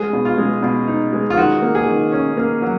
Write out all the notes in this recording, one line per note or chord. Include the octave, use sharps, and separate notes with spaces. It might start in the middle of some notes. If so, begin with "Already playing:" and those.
Already playing: G#3 G#4
B2
F4
G#3
B2
D#4
G#3
F4
D#3 F#4
A#3
G#4
D#3
C#4
A#3
F#3